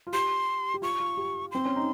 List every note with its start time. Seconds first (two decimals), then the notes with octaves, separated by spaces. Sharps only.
0.07 F4
0.13 G4 C6
0.74 G4
0.82 F4 C#6
1.00 F4
1.17 G4
1.52 C4 C6
1.65 C#4
1.76 D#4